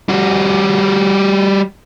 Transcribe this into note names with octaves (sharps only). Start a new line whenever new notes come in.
G3 F#4